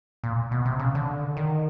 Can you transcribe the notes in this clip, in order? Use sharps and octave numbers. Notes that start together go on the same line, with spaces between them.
A#2
B2
C3
C#3
D3
D#3